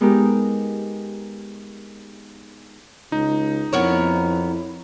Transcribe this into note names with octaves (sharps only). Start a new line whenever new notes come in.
G#3 B3 D#4 G4 A#4
C#2 D#4
F2 B3 E4 A#4 C#5